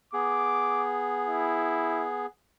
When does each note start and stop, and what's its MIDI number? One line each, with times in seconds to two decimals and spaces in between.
0.13 2.26 59
0.13 2.26 68
0.13 0.83 86
1.26 2.07 64